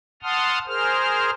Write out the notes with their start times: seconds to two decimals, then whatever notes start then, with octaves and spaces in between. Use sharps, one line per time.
0.23 F#5 A5 C6 D#6 F6
0.67 G#4 A#4 C5 F6